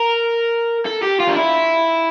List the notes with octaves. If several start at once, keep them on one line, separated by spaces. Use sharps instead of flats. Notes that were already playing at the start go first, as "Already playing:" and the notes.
Already playing: A#4
A4
G4
F4
D4
E4